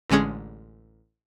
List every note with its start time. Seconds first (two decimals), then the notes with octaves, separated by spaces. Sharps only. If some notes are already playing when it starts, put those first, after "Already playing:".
0.10 A1 D3 G#3 C#4 G#4